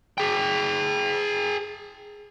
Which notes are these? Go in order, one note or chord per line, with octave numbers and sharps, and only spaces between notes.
G#4 G5